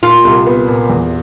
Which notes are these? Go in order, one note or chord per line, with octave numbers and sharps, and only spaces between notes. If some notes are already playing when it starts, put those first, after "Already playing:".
A#2 F4
C2
B3
A#2
E2